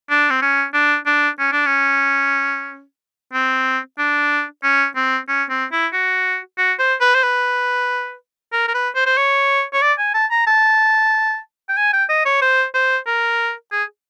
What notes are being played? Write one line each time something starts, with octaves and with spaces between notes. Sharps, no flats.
D4
C4
C#4
D4
D4
C#4
D4
C#4
C4
D4
C#4
C4
C#4
C4
E4
F#4
F#4
C5
B4
C5
B4
A#4
A#4
B4
C5
C5
C#5
C#5
D5
G#5
A5
A#5
A5
G5
G#5
G5
D#5
C#5
C5
C5
A#4
G#4